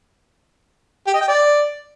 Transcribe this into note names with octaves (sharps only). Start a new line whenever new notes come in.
G4
D#5
G5
D5